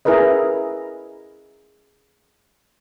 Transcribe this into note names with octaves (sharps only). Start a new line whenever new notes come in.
E4 G#4 A#4 B4 D#5